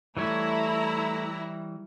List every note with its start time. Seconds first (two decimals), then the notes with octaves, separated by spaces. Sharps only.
0.17 E3 G3 A3 E4 C#5 A#5